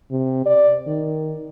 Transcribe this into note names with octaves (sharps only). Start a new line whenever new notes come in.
C3
D5
D#3